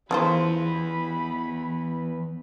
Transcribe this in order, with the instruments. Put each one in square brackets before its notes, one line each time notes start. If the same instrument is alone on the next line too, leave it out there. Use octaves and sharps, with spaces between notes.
[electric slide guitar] E2 [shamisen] C#3 F3 C5 [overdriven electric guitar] E3 B3 [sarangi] B5